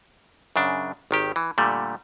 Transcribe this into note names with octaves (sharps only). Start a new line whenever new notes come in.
F#2 C#3 D4
G#1 D#3 G4
E3
A#2 D3 G3 A3